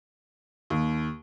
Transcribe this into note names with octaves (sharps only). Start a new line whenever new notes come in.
D#2